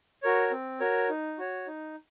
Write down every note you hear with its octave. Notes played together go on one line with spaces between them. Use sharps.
F#4 A#4 C#5
C4
F#4 A#4 C#5
D#4
F#4 C#5
D#4